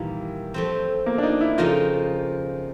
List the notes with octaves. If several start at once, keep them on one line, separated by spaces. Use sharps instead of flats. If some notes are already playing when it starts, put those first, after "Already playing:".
Already playing: A#2 D#3 E3 G3 A#3
F3 A3 C4
A#3
D4
D#4
E4
F2 C#3 F3 A#3 D#4 F4